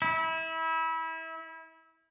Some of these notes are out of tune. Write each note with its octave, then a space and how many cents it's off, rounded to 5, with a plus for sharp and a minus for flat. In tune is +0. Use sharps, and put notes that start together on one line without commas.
E4 -25